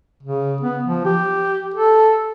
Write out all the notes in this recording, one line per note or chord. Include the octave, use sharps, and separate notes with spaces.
C#3
B3
F3
G4
A4